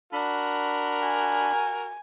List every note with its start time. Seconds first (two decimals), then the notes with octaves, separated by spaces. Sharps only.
0.13 D4 F#4 A#4 B5
1.02 G#5